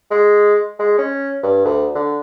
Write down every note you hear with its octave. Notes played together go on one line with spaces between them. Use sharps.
G#3
G#3
C#4
G2
D2
D3